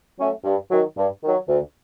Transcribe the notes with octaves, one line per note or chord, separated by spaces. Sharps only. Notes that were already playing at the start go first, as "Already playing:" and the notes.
F#3 A3 C#4
G2
D#3 F#3
G2
D#3 F#3
D2